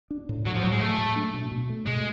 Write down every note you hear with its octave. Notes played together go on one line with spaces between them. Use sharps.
D4
A2
A2 F#3
F3
A2 F#3
G#3
F#3 A3
A2
D4
B2
B2
A3
B2 G#3